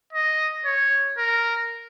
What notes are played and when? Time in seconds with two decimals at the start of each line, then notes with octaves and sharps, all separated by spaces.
0.13 D#5
0.65 C#5
1.18 A#4